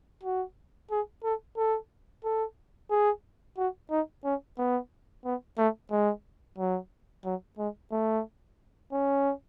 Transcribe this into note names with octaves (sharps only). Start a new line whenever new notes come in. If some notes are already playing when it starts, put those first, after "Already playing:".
F#4
G#4
A4
A4
A4
G#4
F#4
D#4
C#4
B3
B3
A3
G#3
F#3
F#3
G#3
A3
C#4